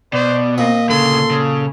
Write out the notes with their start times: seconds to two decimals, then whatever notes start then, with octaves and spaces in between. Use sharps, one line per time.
0.13 B2 C5 D5
0.58 A#2 C4 D#5
0.89 D2 C#3 A4 C6
1.30 C#3